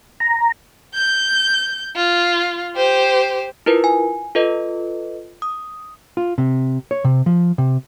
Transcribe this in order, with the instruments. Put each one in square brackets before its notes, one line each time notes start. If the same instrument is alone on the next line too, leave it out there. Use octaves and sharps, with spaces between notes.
[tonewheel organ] A#5
[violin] G6
F4
G4 C5
[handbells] E4 F4 A#4 B4
G#5
F4 A4 B4 D#5
D#6
[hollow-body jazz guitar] F4
C3
C#5
C3
F3
C3